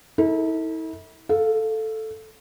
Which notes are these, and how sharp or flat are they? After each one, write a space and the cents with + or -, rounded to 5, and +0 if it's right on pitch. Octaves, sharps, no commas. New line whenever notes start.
E4 -40 A4 +30
A4 +0 F5 +0